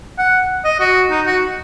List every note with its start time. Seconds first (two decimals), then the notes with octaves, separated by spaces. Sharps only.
0.18 F#5
0.64 D#5
0.80 F#4
1.10 D#4
1.26 F#4